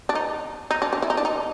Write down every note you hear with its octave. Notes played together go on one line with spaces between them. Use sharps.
D4
D#4
D#4
D4
D4
E4
D#4
D4
D#4